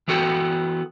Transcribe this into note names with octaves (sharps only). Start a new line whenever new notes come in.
E3 B3 F#4 A4 G5